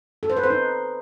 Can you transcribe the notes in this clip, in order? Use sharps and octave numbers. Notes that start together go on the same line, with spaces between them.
A4
C5
B4
C5
D#4